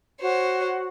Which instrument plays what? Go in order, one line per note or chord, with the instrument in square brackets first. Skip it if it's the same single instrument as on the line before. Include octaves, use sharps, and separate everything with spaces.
[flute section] F#4 [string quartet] C5 C#5